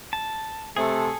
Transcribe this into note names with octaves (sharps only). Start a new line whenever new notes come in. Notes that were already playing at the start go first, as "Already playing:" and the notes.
A5
C3 A3 G#4 A4